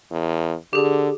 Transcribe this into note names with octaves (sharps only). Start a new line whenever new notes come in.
E2
D3 G4 G#4